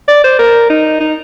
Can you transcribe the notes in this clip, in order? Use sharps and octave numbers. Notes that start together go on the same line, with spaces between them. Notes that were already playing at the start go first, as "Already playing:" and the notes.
D5
C5
A#4
D#4
D#4